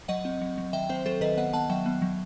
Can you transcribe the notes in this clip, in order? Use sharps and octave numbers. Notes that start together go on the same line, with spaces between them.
F#3 D#5 F#5
C4
F#3
F#3
D#3 E5 G5
C4 C5 E5
F#3 A4 C5
D#3 B4 D#5
B3 D#5 F#5
B3 F#5 A5
F#3 E5 G5
B3
F#3